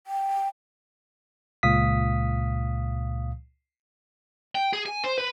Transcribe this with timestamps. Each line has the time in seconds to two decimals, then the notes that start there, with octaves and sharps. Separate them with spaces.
0.07 G5
1.63 C#2 A#2 F5 D#6 B6
4.55 G5
4.73 G#4
4.86 G#5
5.04 C5
5.18 B4